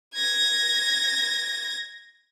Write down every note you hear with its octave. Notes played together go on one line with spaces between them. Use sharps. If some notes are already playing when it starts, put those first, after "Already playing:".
G#6 A#6